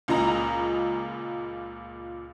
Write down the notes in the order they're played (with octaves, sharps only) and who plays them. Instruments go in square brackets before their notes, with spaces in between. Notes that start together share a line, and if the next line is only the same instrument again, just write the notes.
[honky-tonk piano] C#2 A#2 D#5 A#5